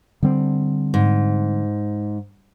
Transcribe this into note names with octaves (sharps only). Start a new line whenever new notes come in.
D3 G3 C4
G#2